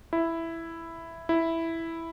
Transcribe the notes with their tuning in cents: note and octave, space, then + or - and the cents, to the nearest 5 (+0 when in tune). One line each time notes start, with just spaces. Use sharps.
E4 +5
E4 +0